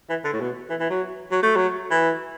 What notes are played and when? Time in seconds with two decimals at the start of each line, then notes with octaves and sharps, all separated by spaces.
0.09 E3
0.24 D3
0.33 A2
0.40 B2
0.70 E3
0.80 E3
0.90 F#3
1.31 F#3
1.42 A3
1.56 F#3
1.91 E3